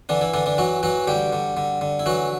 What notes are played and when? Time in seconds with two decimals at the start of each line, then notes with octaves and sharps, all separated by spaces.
0.09 D3 E3 D4
0.21 E3 E4
0.34 D3 E3 D4
0.46 D3 D4
0.58 E3 F#3 F#4
0.83 E3 F#3 F#4
1.07 D3 G3 G4
1.33 D3
1.57 D3
1.81 D3
1.99 E4
2.06 E3 F#3 F#4